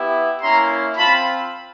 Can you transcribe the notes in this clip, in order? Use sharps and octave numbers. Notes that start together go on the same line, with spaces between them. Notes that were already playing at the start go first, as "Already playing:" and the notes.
Already playing: B3 E4 G4
A#3 C#4 E4 A#5 C6
C4 F4 A5 B5